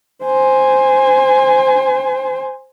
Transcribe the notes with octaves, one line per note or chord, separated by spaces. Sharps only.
C5 G#5